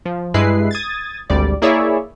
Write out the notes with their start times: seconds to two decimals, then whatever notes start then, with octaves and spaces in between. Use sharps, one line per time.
0.05 F3
0.34 G2 G#3 E4 B4 C7
0.71 D#6 G#6 A6
1.30 G#1 D2 G3 D5
1.62 A#3 E4 G#4 C#5 D5 E5